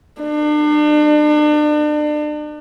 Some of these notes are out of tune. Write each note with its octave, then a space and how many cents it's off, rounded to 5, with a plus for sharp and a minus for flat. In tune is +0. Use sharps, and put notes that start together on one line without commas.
D4 +35